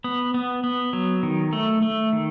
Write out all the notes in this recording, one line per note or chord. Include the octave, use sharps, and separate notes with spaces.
B3
B3
B3
F#3
D#3
A3
A3
D#3